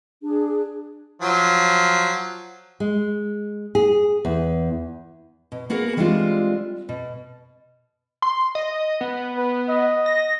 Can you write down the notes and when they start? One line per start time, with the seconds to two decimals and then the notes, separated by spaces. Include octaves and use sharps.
0.22 D4 G#4
1.21 F3 F#3
2.80 G#3
3.75 G#4
4.25 E2
5.52 B2
5.70 A#3 B3 F#4 G#4 A#4
5.96 E3 G3 G#3 C4 D4 F4
6.89 B2
8.22 C6
8.55 D#5
9.01 B3
9.37 B4
9.69 D#5
10.06 A#6